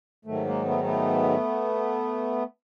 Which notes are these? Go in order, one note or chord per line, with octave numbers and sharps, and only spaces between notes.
G#2 D#3 F#3 A3
G#3 A#3
A3 B3
A3 B3